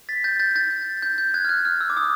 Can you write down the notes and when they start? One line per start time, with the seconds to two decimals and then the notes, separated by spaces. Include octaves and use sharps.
0.09 A6 B6
0.24 G6 A6
0.39 G6 A6
0.55 G6 A6
1.02 G6
1.18 G6
1.34 F#6 G#6
1.45 F6
1.49 F#6
1.65 F6
1.81 E6
1.90 D6
1.97 D#6